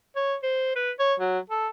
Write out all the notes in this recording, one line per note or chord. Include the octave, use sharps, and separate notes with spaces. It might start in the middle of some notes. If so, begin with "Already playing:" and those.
C#5
C5
B4
C#5
F#3
A4